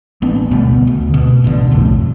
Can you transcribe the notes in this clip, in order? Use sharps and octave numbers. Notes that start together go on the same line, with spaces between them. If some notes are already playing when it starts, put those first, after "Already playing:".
A1 B3 D4
D2 B2 G3 B3
D2
B2
A1 B2 D3
B1 F2 A2